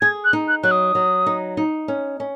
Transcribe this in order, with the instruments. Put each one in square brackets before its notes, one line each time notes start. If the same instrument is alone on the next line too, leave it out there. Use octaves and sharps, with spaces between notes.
[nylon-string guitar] G#4 [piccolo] G#6
[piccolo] F#6
[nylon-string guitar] D#4
[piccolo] F#6
[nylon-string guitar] F#3 [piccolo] F#6
[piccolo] D#6
[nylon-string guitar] F#3
D#4
D#4
C#4
C#4